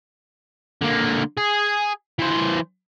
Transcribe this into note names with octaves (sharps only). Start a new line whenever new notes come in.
D3 A#3
G#4
E3 C5